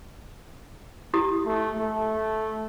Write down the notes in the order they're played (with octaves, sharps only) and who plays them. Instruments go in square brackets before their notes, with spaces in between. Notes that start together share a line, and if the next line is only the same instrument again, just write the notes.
[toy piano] E4 G4 D#6
[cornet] A3
A3